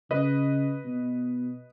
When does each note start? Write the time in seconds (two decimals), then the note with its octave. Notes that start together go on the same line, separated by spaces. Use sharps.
0.10 C#3 B4 D#5
0.84 B2